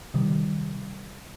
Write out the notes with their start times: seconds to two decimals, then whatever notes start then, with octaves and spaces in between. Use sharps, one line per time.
0.14 C3 D#3 G3